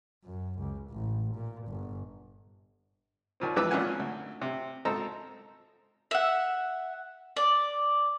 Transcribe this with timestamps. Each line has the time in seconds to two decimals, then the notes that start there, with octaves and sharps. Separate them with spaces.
0.24 F#2
0.59 C#2
0.90 A1
1.35 A#2
1.68 G1
3.40 D#2 A#2 C4
3.56 G#1 F2 E3 B4 D6 E6
3.71 G#1 A#2 C#4 F#4 F#5 G#5
3.99 D2
4.42 C3
4.85 G#1 A4 C5 D#5 A#5 E6
6.11 E5 F#5
7.37 D5